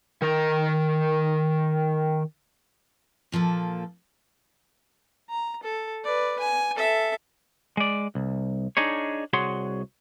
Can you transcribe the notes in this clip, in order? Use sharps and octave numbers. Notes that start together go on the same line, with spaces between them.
D#3 A#4
A#2 F3 A#3 A4
A#5
A4
B4 D5
G#5
A4 E5
G#3 D5
C2
D4 D#4 G#4 C#5
C2 F#4 G#4 C#5 F#5 C6